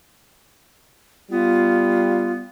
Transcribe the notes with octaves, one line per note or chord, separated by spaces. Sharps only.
G3 B3 F4